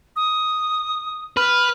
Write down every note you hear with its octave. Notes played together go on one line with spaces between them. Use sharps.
D#6
B4 F6